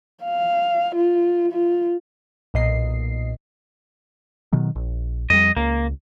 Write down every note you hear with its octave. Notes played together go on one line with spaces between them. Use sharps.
F5
F4
F4
B1 A#2 D#5 C7
B2 D#3 F#3
A#1
F2 G3 D#5
C#2 A#3